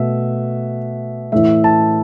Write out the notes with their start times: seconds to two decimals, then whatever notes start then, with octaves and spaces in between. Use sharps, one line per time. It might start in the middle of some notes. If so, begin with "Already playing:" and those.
Already playing: B2 A3 E5
1.32 A2 E3 A3 E5
1.64 A5